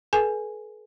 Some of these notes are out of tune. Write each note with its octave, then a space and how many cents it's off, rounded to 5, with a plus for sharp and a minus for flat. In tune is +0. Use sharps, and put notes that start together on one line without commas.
G#4 +45 B4 -45 G#5 +0